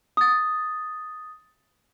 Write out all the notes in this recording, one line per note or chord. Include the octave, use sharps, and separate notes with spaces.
D#6 A6